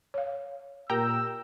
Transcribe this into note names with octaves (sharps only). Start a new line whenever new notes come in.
C#5 F5
A#2 G4 A#4 G5 A#5 E6